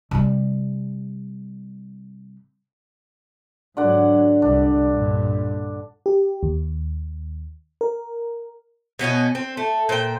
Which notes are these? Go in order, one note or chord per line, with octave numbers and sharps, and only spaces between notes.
C3 G3
G#2 D3 F#3 D5 F#5
C2 D4
G2 A#2
G4
D#2
A#4
B2 B3 C#4 D#5
C4
A3
A#2 C5 G5